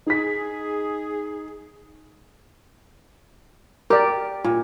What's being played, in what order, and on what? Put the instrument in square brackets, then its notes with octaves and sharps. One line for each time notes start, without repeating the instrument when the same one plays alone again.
[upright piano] D#4 B6 [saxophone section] G#4
[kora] G4 [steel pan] A#4 D5
[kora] A#2